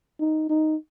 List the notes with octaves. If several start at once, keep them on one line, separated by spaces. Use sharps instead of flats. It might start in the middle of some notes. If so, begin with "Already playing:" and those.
D#4
D#4